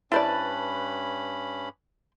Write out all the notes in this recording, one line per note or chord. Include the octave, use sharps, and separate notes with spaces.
G2 C#4 E4 B4 C5 D5 A5 B5